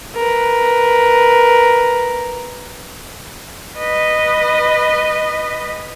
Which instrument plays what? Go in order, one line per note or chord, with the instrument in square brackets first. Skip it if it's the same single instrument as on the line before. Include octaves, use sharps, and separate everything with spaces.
[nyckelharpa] A#4 B4
[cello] B4 D#5